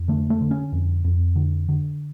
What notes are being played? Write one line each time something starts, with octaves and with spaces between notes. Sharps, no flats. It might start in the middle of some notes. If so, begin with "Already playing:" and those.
Already playing: F2
D3 A3
A3
D3
C#4
F2
F2
D3
D3